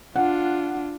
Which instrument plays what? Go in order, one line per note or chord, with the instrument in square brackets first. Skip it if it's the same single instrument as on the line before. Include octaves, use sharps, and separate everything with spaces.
[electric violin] D4 F4 [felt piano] F#5